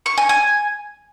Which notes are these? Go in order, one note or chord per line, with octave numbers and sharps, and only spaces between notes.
C#6
G#5
G#5